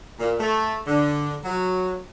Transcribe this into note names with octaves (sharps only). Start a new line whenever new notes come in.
A#2
A3
D3
F#3